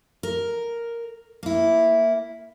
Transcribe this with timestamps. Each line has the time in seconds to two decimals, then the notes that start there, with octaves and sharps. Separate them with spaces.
0.23 A#4
1.43 A#3 E4